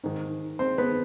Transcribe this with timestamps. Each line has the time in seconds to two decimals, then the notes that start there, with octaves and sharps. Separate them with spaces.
0.04 G#2 D#3
0.59 C4 C5
0.78 B3 B4